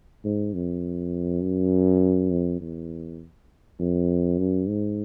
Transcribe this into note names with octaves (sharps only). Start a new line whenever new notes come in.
G#2
F2
F#2
F2
E2
F2
F#2
G#2